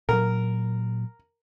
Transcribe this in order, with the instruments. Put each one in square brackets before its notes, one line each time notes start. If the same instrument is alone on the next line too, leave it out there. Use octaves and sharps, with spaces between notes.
[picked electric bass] A#2 F#3 [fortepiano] A#4